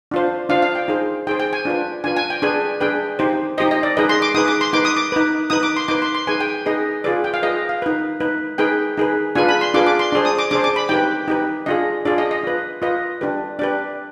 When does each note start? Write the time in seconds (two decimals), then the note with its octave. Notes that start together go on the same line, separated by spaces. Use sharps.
0.11 D4 F4 C5
0.49 D4 F4 C5 F5
0.62 F5
0.75 G5
0.88 D#4 G#4 C5
1.27 D#4 G#4 C5 G5
1.40 G5
1.53 G#5
1.65 D4 F4 B4
2.04 D4 F4 B4 G#5
2.17 G#5
2.30 G5
2.42 D4 G#4 B4 G#5
2.81 D4 G#4 B4 G5
3.19 D#4 G4 C5
3.58 D#4 G4 C5 D#5
3.71 D#5
3.83 D5
3.97 D#4 G#4 B4 D#5
4.09 C6
4.22 D6
4.35 D#4 G#4 B4 D#6
4.48 D6
4.61 C6
4.73 D#4 B4 D6
4.85 D#6
4.97 D6
5.12 D#4 B4
5.50 D#4 B4 D#6
5.63 D6
5.77 C6
5.88 D#4 B4 D6
6.02 C6
6.15 C6
6.27 D#4 G#4 B4 G#5
6.40 G5
6.66 D#4 G#4 B4 D#5
7.04 F4 G#4 B4 D5
7.24 G5
7.34 F5
7.43 F4 G#4 B4 D#5
7.69 F5
7.82 D#4 B4
8.20 D#4 B4
8.58 D#4 G#4 B4 G5
8.97 D#4 G#4 B4
9.35 D4 F4 G#4 B4 G#5
9.49 B5
9.61 C6
9.74 D4 F4 G#4 B4 D6
9.87 D6
9.99 C6
10.12 D4 G#4 C5
10.25 D#6
10.39 D6
10.51 D4 G#4 C5 D6
10.64 D6
10.76 B5
10.89 D#4 G4 B4 G5
11.28 D#4 G4 B4
11.66 D4 F4 G#4 D#5
12.05 D4 F4 G#4 D5
12.18 D#5
12.31 D#5
12.43 F4 B4
12.82 F4 B4 D#5
13.21 D4 G4 B4
13.59 D4 G4 B4 D5